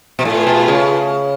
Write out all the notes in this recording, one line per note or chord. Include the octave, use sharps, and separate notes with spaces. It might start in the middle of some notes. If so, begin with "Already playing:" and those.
B2
A2 A3 F4 G#4 B4
B2
C#3